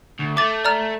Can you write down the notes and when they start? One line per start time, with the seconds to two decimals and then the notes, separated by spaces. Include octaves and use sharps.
0.20 D2
0.37 A3 D6 A6
0.65 D5 A#5 F6